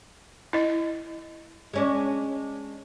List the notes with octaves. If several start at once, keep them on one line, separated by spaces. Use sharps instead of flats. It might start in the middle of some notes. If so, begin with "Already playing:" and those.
E4 D#5
G#3 C#4 D4